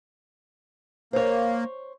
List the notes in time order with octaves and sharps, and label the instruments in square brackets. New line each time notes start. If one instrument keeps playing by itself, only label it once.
[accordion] A#3 [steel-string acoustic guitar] C5 C#5